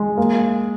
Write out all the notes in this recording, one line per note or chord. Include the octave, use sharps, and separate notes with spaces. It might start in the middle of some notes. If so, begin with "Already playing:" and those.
Already playing: G#3
A#3